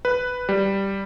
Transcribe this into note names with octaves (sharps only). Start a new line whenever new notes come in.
B4
G3